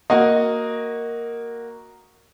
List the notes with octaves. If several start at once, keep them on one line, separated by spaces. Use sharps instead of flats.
A#3 F#4 D#5